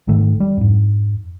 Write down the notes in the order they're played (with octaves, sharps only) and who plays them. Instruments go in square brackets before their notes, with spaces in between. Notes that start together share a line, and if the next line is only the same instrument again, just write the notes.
[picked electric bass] G#1 G#2 D#3 A3
G3
F2 G#2